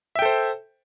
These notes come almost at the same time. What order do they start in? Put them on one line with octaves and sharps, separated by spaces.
E5 G5 A4 C5